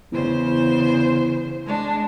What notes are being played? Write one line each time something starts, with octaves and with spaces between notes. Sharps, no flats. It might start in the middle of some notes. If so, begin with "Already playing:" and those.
E2 C#3 C5
G#3 D4